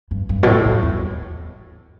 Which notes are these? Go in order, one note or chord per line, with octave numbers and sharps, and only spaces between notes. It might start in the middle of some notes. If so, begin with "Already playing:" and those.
G2
G2
B2
A2
G2
E2